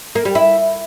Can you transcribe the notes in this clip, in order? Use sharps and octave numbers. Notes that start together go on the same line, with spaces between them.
A#3
G3
E4